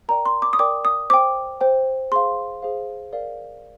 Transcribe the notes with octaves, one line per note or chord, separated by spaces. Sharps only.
A#4 D5 G5 A#5
C6
D6
D#6
A#4 D5 G5 D6
D#6
C5 G5 D6
C5 G5
G#4 C5 F5 C6
G#4 C5 F5
A#4 D5 F5